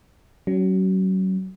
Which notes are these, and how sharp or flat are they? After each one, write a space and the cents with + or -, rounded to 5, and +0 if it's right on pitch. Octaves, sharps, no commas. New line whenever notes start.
F#3 +30 C#4 +0